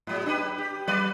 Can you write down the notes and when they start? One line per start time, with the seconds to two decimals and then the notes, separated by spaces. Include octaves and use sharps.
0.07 G#2 F#3 G#3
0.26 D4 G4 B4
0.58 G4
0.88 F#3 B4 D5